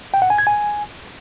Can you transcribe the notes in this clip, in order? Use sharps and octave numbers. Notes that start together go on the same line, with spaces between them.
G5
F#5
G#5
G#6
G#5